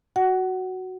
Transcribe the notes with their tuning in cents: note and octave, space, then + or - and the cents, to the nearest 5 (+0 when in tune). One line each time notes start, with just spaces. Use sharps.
F#4 +0 F#5 +20